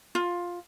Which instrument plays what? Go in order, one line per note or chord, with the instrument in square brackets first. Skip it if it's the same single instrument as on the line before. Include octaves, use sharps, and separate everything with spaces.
[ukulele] F4